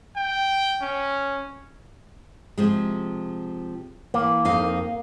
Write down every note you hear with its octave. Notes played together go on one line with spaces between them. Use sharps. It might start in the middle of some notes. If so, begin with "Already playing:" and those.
G5
C#4
C3 F3 G#3
E3 A#3
F2 D#4 F5